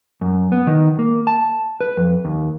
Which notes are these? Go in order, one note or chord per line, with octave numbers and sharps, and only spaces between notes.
F#2
B3
D#3
A#3
A5
B4
F2
D#2